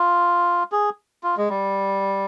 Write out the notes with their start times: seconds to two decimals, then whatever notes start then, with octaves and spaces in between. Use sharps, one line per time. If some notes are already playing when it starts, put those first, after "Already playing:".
Already playing: F4
0.72 G#4
1.23 F4
1.37 G#3
1.49 G3